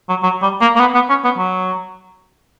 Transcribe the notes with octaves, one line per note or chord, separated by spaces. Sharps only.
F#3
F#3
G3
A#3
A#3
B3
B3
C#4
B3
F#3